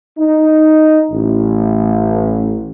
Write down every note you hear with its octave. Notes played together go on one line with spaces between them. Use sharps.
D#4
A1